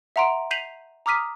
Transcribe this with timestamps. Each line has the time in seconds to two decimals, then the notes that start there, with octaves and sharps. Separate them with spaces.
0.16 E5 F#5 A#5 C6 D7
0.51 G6 B6 C7 D#7 F7 F#7
1.06 A#5 D6 D#6 F6 B6 D#7